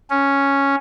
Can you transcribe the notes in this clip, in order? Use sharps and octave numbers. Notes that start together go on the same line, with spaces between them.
C#4